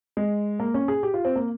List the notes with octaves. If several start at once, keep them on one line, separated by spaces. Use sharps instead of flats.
G#3
A#3
C#4
G#4
G4
F4
C4
A#3